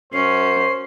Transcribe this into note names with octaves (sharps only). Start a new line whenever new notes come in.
F#2 C#4 C5 C7